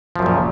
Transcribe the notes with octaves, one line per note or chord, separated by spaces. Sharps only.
F#2 A#2 C#3 F3